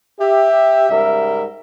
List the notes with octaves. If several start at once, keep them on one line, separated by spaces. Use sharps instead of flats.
G4 E5
G#2 C#3 G3 A#4 E5